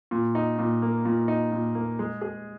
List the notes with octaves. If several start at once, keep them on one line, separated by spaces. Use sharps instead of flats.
A#2
D#4
A#2
A#3
A#2
D#4
A#2
A#3
G#3
G#4